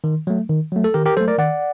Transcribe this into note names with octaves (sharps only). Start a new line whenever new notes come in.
D#3
F#3 A3
D#3
F#3 A3
A4
D#3 G4 A#4
G4 A#4
F#3 A3 A4 C5
A#4 D5
D#3 D5 F#5